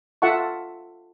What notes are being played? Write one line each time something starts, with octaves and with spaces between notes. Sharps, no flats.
F4 A4 E5 F#5 A5 C#6